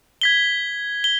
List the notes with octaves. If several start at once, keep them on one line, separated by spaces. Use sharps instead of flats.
G#6 B6 G7
G7